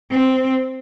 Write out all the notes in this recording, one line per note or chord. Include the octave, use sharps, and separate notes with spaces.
C4